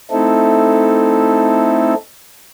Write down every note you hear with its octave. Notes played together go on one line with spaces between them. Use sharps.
A3 C4 D#4 E4 A4